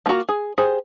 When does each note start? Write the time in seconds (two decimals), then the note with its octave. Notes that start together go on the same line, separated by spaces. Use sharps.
0.06 F3 A#3 F4 F#4 A#5
0.29 G#4
0.58 G4 G#4 C5